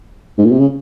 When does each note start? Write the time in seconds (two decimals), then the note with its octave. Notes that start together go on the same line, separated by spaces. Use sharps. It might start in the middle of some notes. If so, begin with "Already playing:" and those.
0.38 G#2
0.45 A#2
0.52 C3
0.59 C#3